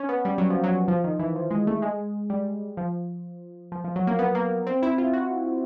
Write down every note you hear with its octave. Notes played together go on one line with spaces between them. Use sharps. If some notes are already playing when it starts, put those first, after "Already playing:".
Already playing: C#4
B3
G3
F#3
F3
F#3
F3
D#3
E3
F3
G#3
A3
G#3
G3
F3
F3
F3
F#3
A#3
B3
A#3
C4
E4
F4
F#4